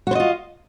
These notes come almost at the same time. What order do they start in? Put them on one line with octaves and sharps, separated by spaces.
F#4 C5 D#5 F4